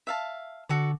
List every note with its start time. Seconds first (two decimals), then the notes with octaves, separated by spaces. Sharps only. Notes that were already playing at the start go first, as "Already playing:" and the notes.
0.07 E5 F5 A5
0.69 D3 F#4 A4 D5